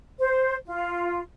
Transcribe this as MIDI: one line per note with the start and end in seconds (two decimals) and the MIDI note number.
0.19 0.55 72
0.66 1.21 65